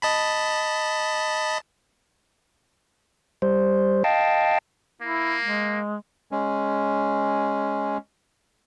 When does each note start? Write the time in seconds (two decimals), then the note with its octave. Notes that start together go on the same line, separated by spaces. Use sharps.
0.02 D#5 A5 B5
3.42 G3 C5
4.04 D#5 F5 G5 A5
5.01 A#3 E4
5.41 G#3
6.31 G#3 C#4